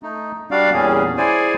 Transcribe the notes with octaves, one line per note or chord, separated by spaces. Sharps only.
A3 D#4
G3 D4 F#4 D5 F5
E2 A#2 G3 C#4 G#4
E4 G#4 C5 D5 G#5